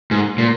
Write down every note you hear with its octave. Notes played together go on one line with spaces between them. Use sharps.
G#2
A#2